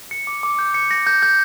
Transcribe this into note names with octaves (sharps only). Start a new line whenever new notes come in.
C#7
D6
D6
G6
C#7
A#6
G6
G6